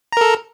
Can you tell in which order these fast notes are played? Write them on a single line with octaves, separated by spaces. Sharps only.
A#5 A#4 A4